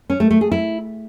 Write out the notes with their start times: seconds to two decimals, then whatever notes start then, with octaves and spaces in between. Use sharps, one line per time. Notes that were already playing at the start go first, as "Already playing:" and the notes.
0.10 C#4
0.20 A3
0.31 A3
0.41 G#4
0.52 E4